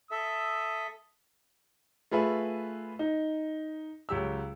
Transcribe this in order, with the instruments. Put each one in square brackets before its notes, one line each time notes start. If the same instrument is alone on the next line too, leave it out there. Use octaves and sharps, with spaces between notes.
[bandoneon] A4 E5 [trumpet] D#6
[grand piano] A3 F4 G#4 B4 E5
D#4
C#2 F#3 G4 E6